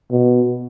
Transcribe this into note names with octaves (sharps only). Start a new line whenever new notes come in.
B2